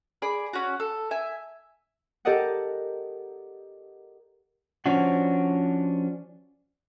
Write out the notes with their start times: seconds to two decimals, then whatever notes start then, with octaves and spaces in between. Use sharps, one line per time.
0.22 G#4 D5 B5
0.53 C#4 F#4
0.80 A4
1.11 E5 G#5
2.25 G4 A4 A#4 D5 D#5 F#5
4.86 F3 C#4 D4 F#4